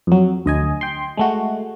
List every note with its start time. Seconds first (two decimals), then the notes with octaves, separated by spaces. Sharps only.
0.07 F2 F#3
0.46 D2 D#5 G#5
0.81 G5 C6
1.17 G#3 A3 F#4